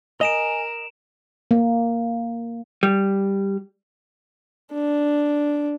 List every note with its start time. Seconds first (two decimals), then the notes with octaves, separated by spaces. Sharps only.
0.21 A#4 D#5 G#5 D7 E7 F7
1.51 A#3
2.83 G3
4.73 D4